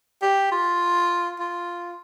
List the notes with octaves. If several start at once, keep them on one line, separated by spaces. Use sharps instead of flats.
G4
F4
F4